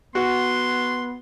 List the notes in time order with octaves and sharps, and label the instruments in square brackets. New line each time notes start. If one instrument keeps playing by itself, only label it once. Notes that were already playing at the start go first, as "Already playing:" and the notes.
[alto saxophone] B3 [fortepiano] F#4 [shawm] C6